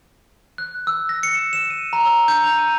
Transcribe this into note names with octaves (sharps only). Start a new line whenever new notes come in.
F#6
E6
A#6
C#7
E7
E7
D#7
A#5
E6
G6
F7
D#7